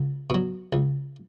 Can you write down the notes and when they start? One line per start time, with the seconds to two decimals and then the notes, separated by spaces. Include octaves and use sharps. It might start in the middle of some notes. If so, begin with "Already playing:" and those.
Already playing: C#2
0.30 B2 F#3
0.73 C#2